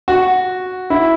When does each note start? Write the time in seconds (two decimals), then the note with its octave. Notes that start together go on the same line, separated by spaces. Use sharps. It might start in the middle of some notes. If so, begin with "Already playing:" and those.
0.08 F#4
0.90 E4